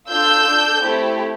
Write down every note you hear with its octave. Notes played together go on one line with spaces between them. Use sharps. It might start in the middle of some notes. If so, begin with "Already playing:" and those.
D4 F4 A4 E6 G6
D4 A4
A3 C4 E4 G4